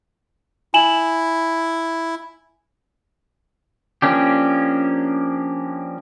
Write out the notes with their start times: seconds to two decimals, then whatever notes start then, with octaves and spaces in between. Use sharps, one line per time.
0.74 E4 G#5 E7 F#7
4.02 F3 A#3 C#4 D4 G4